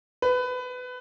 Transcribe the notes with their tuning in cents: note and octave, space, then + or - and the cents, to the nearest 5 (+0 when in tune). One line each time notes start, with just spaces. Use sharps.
B4 +20